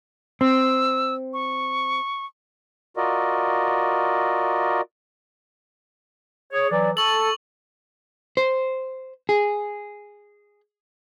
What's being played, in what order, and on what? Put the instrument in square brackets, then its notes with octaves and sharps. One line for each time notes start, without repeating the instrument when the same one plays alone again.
[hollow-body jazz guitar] C4 [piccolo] E6
[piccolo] C#6
[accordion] F4 F#4 A#4 D5 D#5
[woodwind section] G#4 C#5
E3 F#3 D5
[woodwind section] A4 [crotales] C#6 F#7
[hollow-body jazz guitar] C5
G#4